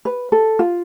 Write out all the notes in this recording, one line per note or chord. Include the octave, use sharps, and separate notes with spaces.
B4
A4
F4